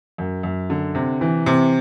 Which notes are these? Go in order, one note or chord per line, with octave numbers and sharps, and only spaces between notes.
F#2
F#2
D3
C3
E3
C3